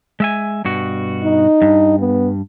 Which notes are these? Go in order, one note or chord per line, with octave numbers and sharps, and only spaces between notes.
G#3 E5 G#5
G2 B2 F#4
D#4
G2
B3